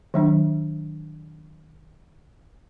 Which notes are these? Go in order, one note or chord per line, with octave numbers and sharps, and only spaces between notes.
D#3 F#3 D4